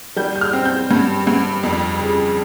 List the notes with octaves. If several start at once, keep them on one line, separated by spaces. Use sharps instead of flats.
G3 G6
G6
F6
C4
G6
G2
G2
F2
C#3